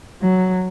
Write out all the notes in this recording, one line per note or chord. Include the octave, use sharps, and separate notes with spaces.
F#3